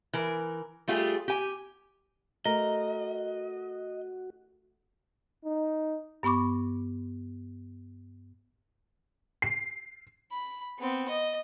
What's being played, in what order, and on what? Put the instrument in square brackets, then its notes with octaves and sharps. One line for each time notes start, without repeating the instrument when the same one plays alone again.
[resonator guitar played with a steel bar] E3 A#4
G3 A3 F4 G4 G#4
G4 G#5
[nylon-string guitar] A3 [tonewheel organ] F#4 [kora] A#4 [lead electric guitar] D#5
[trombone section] D#4
[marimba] G2 B3 B5 C#6 D6
[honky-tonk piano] C7
[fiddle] B5
B3 C4
D#5